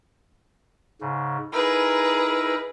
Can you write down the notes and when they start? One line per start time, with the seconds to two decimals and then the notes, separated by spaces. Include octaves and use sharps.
1.01 G#2 C#3
1.53 D#4 E4 G#4 A#4 B4